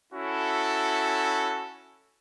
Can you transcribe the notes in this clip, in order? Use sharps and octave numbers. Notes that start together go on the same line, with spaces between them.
C#4 E4 F#4 A4